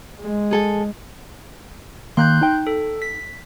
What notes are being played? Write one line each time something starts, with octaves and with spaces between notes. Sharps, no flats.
G#3
G#4 A4 G#5
D#3 A#3 C6 F#6 G6
D#4 G5
A4
B6